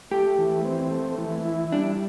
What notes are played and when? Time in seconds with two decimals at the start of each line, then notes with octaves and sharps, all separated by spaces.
0.11 A3 G4
0.38 E3
0.65 C4
0.91 A3
1.18 E3
1.45 E4
1.72 G3 D4